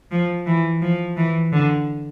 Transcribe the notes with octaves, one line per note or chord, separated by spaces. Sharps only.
F3
E3
F3
E3
D3